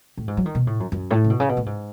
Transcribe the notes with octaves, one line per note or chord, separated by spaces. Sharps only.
A2
G#2
F#3
D#3
B2
A2
F#2
F#2
A2
C#3
B2
C#3
B2
A2
G#2